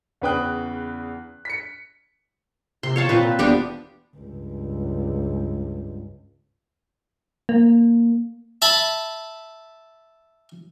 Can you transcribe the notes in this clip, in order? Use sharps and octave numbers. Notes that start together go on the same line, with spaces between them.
E2 C#3 B4 G5 D#6 F#6
B6 C#7
C3 C6
C#5 F5 A5
A#2 C4 F4 B4
E1 B3 D4 G4
C#2 G2
A#3
E5 A5 B5